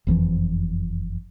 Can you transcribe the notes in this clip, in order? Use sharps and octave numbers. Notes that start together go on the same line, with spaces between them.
F#1 F2 E3 F3